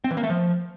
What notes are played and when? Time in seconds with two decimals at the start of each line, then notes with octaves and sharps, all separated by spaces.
0.04 C4
0.11 E3
0.17 A#3
0.23 A3
0.30 F3